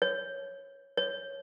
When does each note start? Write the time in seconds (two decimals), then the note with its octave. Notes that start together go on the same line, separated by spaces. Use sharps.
0.02 C#5
0.97 C#5